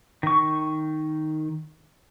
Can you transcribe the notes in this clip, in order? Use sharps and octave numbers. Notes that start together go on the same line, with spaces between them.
D#3 C#6